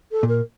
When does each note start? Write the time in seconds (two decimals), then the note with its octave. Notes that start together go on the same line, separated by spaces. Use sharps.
0.12 A4
0.23 A#2
0.29 A#4